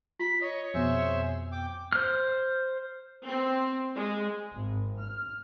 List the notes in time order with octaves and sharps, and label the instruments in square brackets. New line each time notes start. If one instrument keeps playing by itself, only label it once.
[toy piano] F4 [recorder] B6
[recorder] C#5 [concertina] D#5
[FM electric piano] F2 B2 [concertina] G#4 C5 E5
[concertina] G5 D6
[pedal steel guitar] C5 F6
[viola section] C4
G#3
[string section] G#1
F6